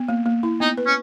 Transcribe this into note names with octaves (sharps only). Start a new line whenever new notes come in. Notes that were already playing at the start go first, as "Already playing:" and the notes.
Already playing: B3
A#3
A#3
E4
B3 D#4
B4
C#4